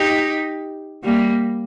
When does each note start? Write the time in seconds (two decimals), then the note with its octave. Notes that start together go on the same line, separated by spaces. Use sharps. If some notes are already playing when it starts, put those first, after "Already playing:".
Already playing: D#4 G4
1.04 G3 A#3